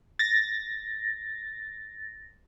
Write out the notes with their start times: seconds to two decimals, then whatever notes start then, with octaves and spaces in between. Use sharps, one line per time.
0.19 A6 A#6